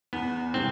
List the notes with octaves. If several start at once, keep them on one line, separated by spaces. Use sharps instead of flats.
E2 B3
C3 E3 G3 C4